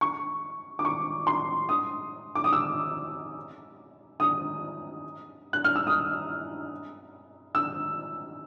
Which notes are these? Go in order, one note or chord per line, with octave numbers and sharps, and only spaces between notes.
C#6
D6
C#6
C6
D#6
D6
D#6
E6
D#6
F#6
F6
E6
D#6
E6